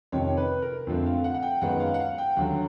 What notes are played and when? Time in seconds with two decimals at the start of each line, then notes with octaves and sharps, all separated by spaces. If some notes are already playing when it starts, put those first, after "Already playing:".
0.12 F2 C3 D#3 C#5
0.37 B4
0.62 A#4
0.87 F2 D3 F3 A3 C4
1.06 F5
1.24 F#5
1.34 F#5
1.43 G5
1.62 F#2 D#3 G#3 B3 F#5
1.80 F5
1.94 F#5
1.99 F5
2.18 G5
2.37 D#2 D3 F#3 F#5